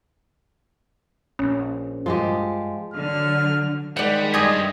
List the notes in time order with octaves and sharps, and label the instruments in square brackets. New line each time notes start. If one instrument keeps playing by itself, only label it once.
[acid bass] A#1 [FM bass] C#4
[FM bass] G2 [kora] F3 G#3 G4
[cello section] D3 F#3 [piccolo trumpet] F6
[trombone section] D#3 G#3 [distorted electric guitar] G3 [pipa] D5 F#5
[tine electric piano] G2 D5 G#6 [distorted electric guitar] A3 F4 [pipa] G4 G#4 D#5